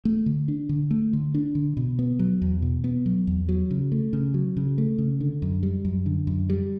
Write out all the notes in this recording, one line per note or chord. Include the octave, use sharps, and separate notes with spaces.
A3
D3
D4
D3
A3
D3
D4
D3
B2
B3
F#3
E2
B2
B3
F#3
E2
F#3
C#3
A3
C#3
F#3
C#3
A3
C#3
D3
F#2
G3
F#2
D3
F#2
G3